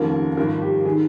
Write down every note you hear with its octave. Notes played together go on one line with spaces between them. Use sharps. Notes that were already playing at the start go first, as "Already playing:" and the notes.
Already playing: F1 D#2 C#3 F3 A#4
G#1 G2 F3 A#4
G4
D#3 G#4